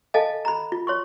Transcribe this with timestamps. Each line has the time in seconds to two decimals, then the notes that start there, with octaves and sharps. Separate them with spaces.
0.14 A4 D#5 F5 G#5 A5
0.45 A#5 B5
0.72 F4
0.87 C#5 C6 C#6